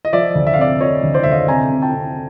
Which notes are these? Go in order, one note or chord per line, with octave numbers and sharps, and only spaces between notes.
D#5
F3 D5 E5
D2
E5
F5
C3 D5 E5
F3 C#5 D#5
D2
C5 D5
D2 E5
D#5 F5
C3 G#5 A#5
C3
G5 A5
C3